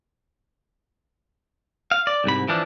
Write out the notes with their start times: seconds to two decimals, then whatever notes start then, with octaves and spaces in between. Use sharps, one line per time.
1.91 F5
2.07 D5
2.24 C2 G#2 B5
2.49 E3 F3 D4